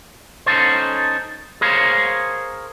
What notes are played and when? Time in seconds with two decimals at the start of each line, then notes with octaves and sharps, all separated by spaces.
0.46 C#4 D#4 A4 C5
1.61 G#4 A#4 C5 C#5 F5